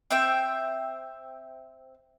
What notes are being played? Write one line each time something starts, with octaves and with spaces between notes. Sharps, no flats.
C4 E5 G5